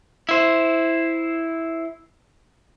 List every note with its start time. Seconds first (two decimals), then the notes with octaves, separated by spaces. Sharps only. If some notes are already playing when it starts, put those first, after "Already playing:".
0.29 E4 C5